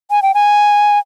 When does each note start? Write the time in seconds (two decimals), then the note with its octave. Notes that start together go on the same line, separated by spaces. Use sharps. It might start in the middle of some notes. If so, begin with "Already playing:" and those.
0.11 G#5
0.23 G5
0.34 G#5